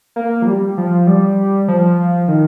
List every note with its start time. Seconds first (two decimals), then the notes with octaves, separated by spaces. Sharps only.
0.16 A#3
0.42 F3
0.47 G3
0.77 F3
1.07 G3
1.68 F3
2.28 D#3